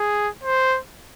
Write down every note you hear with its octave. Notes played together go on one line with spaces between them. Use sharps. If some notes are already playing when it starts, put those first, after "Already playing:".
Already playing: G#4
C5